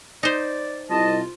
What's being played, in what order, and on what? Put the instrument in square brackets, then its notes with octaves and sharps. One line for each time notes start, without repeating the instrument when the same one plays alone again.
[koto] D#4 C5 [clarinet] D5
[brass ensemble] C2 [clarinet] F4 [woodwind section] D#5 A5